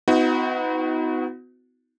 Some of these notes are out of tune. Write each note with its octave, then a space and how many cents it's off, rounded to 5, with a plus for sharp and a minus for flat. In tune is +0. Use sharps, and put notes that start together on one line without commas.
B3 +35 D#4 +40 F#4 -15